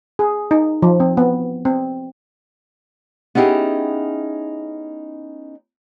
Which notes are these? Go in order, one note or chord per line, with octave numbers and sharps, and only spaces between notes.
G#4
D#4
F3
C4
B3
C4
B3 C#4 D#4 E4 G4 G#4